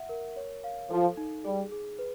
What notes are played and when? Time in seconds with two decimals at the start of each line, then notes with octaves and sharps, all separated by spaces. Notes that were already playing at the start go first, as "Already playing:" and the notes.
Already playing: E5 F#5
0.09 A#4
0.36 C#5
0.64 F5
0.90 F3 A4
1.17 D#4
1.44 G3 G#4
1.72 G#4
1.99 B4